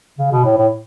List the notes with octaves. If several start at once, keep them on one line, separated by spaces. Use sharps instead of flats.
C#3
B2
A2
A2